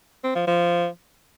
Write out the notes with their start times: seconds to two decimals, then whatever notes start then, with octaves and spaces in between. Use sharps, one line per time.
0.24 C4
0.35 F3
0.47 F3